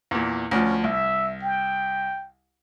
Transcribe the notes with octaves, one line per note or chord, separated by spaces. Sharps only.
E2 A#2
D2 F3 C#4
C2 E5
G5